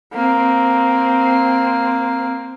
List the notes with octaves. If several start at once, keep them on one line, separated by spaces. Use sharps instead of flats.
A#3 C4